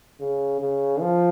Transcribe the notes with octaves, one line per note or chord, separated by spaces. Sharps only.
C#3
C#3
F3